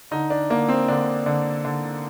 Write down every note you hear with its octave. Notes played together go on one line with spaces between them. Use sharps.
D3 D#4
D4
D3 A#3
C4
D3 D4
D3
D3